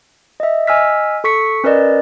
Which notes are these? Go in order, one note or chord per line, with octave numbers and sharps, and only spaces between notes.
D#5 E5
D#5 G#5 E6 F6 B6
A4 C#6 B6 C#7
C#4 A#4 B4 D5 D#5